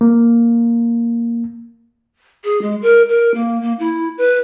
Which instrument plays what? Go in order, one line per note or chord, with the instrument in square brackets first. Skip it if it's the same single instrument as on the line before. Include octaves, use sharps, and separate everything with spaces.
[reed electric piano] A#3
[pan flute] G#4
G#3
A#4
A#4
A#3
A#3
E4
B4